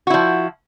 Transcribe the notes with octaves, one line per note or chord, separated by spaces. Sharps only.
F3 E4 F#4